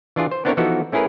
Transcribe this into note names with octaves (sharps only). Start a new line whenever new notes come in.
E3 D4 F4 G#4
C5
B3 C4 D4 E4 A#4 C#5
E3 F3 B3 D#4 F#4 A4
A3 C#4 E4 G#4 A#4 B4